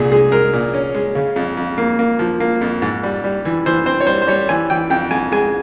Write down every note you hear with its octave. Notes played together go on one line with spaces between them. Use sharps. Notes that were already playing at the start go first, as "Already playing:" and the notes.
Already playing: C2 A#2 G#4
G#3 G#4
G#3 A#4
A#2
C#4
G#3
C#3
F2
F2
A#3
A#3
F3
A#3
F2
G#2
G3
G3
E3
E3 C5
C4 C5
C#5
G3 C5
C5
G3 C#5
E3 G#5
E3 G5
F2 G5
F2 G#5
G#3 G#5